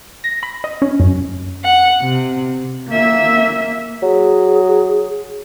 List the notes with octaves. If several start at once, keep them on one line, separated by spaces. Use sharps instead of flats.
A#6
B5
D#5
C#4
F#2
F#5
C3
A#3 E5
F#3 G#4